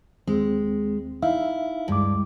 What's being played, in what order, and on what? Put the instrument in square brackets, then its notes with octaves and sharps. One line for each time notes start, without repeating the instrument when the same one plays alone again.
[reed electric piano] D#2 C4 [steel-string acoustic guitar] G#3
[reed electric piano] D#4 E5 F5 [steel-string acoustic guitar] E4
[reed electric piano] D2 G#3 D6 [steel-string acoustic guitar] G2